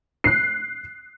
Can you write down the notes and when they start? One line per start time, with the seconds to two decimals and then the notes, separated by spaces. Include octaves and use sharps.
0.24 F#6 C7